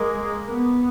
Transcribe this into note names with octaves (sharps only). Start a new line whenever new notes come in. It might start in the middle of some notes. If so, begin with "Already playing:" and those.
Already playing: G#3 A#3
B3